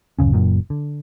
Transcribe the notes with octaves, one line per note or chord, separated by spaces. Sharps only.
D1 F#2 C#3 C#4
F#1 F#2 A#2
D3